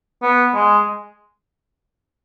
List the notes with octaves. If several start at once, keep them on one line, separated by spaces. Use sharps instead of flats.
B3
G#3